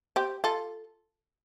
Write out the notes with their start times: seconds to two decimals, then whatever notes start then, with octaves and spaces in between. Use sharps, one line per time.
0.16 G4 C5
0.44 F4 A4